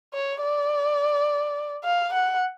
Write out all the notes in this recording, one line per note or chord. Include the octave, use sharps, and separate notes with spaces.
C#5
D5
F5
F#5